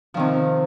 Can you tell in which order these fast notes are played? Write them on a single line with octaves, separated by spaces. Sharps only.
F3 D#3 C3